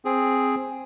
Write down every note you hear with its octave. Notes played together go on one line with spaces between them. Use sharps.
C4 G#4